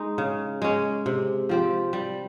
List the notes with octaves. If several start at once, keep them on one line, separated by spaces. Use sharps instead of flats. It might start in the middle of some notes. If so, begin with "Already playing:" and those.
Already playing: G#3 D#4
C#3
G#3 C#4
C3
F3 C4 G4
G3